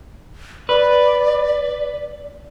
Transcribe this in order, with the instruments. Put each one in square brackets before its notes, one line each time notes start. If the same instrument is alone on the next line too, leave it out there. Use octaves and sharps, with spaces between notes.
[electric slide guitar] B4 [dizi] D5